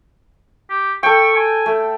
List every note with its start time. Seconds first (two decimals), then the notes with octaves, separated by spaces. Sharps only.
0.70 G4
1.03 A4 G5 C#6
1.36 G#5
1.66 A3